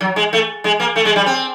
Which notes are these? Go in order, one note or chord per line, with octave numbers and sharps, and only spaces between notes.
F#3
G#3
A3
G#3
A#3
A3
G#3
G3
C4